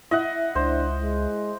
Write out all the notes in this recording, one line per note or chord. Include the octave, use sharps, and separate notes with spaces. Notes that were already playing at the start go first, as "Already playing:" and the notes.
E4 D#5 F#5
C#2 D4 C5
G#3